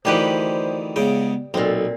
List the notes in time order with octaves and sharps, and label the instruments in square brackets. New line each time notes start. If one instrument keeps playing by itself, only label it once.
[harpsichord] D2 D#3 E3 [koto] G3 G4 B4 [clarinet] C5
[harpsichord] C#2 C#3 G5 [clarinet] B3
[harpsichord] B1 [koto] A#2 C4 [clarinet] A4